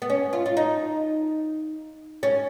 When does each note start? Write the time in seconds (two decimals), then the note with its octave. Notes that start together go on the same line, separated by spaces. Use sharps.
0.02 B3
0.10 C#4
0.33 F4
0.46 F4
0.57 D#4
2.23 C#4